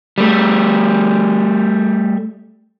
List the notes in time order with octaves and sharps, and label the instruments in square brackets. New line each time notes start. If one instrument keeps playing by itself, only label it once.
[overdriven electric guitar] G3 A3